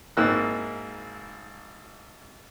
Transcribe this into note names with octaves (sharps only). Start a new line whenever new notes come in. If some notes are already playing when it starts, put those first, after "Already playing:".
G#1 G#2 A#3 E4 E6 F#6